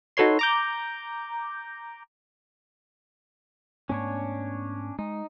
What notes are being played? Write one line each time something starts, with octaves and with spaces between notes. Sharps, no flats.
D#4 F#4 A4 B4 C#5 C6
A#5 D6 G6
G#2 A3 B3 C#4 D4 C#5
G#3 D#4